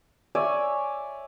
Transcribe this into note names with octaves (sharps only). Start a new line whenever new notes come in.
C#5 D5 E5 G#5